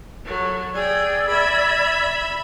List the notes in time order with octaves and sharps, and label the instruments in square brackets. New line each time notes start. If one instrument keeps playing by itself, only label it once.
[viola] F#3 A4
[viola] G#4 G5 [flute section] D5 E6 G#6
[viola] E5 B5